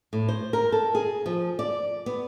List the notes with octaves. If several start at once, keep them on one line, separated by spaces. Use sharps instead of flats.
A2
C5
A#4
A4
G#4
F3
D5
B3